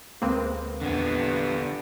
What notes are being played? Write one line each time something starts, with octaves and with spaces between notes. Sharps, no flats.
D2 G#3 A#3 C4 B4
A#1 E2 D3 B3 G#6